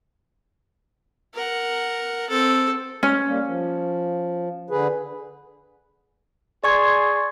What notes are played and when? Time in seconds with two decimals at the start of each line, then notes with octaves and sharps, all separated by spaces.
1.34 A#4 F#5
2.29 C4 A4
3.03 C#4
3.27 G3 A#3
3.47 F3
4.70 D3 G#4 B4
6.64 G#4 D5 C6 C#6 G#6